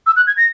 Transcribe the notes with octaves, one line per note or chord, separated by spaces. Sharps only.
E6
F#6
G#6
A#6